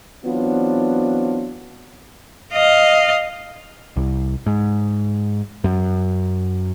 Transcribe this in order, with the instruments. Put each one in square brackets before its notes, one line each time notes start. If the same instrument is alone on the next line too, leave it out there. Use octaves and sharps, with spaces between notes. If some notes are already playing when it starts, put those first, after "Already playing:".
[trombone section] E3 F#3 B3 C4 D4 F4
[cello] D#5 F5
[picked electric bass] C2
G#2
F#2